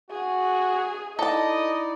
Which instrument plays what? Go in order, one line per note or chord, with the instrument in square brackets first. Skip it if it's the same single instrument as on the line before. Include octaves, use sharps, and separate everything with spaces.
[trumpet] F#4 [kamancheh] G#4
[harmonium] D#4 E4 D5 [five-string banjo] A4 A5 [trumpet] D#5